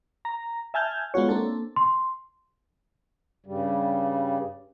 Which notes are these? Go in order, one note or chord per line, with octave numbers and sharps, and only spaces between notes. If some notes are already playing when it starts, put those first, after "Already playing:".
A#5
E5 G#5 A5 F6 G6 G#6
G#3 B3 F4 F#4 C#5
A#3 C4 D4 A4
C6
G2 C#3 G3